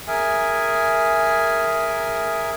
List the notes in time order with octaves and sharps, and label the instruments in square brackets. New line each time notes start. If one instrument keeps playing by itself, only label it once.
[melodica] G#4 A#4 E5 G#5